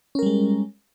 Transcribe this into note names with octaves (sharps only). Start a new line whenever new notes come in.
G3 G#3 C#4 A#4